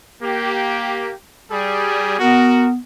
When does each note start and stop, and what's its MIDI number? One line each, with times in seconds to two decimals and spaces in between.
0.21 1.12 58
0.21 1.12 67
1.51 2.15 55
1.51 2.15 68
2.19 2.78 59
2.19 2.68 66
2.19 2.68 70